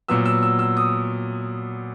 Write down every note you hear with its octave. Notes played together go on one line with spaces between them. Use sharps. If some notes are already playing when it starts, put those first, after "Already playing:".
A#2 F#3 B3 E6
E6
E6
E6
D#6